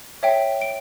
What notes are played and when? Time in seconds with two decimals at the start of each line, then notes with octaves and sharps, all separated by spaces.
0.23 C#5 E5 G5
0.61 D7